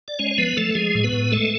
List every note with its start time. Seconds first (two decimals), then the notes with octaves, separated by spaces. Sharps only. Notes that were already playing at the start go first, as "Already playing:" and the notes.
0.08 D5
0.19 G#3 C#4 C#5
0.31 C#5
0.38 F3 B3 B4
0.57 F3 A3 A4
0.75 F3 G#3 G#4
0.95 A2
1.04 B3 B4
1.13 A2
1.32 G#3 A3 A4